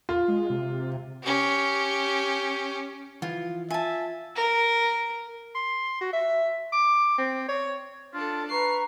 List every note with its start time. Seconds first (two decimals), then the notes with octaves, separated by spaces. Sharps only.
0.09 F4
0.28 G#3
0.50 C3
1.23 C#4 G4
3.22 E3 F3 F4
3.70 F4 E5 G#5 A5
4.36 A#4
5.55 C6
6.01 F#4
6.13 E5
6.72 D6
7.18 C4
7.48 C#5
8.14 D4 F4 A4
8.51 B4 A#5 C#6 C7